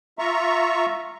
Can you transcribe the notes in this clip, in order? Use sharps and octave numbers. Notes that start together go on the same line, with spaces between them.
F4 E5 A#5 C#6